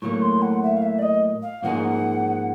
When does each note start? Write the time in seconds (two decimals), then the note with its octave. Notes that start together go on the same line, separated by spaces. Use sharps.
0.02 A2 F#3 A#3 C#6
0.22 C6
0.42 F#5
0.62 E5
0.77 F5
0.82 E5
0.98 D5
1.02 D#5
1.42 F5
1.62 G#2 F3 A#3 D#4 G#4 F#5